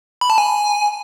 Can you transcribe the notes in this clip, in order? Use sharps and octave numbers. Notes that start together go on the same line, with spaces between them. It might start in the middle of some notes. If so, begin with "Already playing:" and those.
B5
A5
G#5